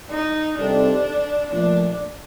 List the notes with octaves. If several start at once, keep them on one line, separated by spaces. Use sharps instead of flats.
D#4
C3 G3 C4 D4 D#4 A4
A#2 F3 A3 D4